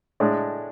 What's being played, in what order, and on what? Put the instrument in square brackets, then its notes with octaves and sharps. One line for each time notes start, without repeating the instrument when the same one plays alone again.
[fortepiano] A2 G#3 D4